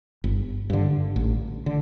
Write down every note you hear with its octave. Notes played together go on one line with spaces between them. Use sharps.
G1
G2 D3
A1
D3